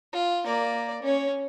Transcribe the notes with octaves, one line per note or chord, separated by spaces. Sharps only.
F4
A#3 D5
C#4 C#5